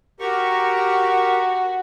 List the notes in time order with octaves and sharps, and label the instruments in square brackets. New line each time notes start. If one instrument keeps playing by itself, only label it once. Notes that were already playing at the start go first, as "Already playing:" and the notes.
[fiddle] F#4 [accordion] G4 A#4 C#6